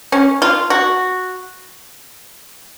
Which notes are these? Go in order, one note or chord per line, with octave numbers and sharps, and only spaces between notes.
C#4
F4
F#4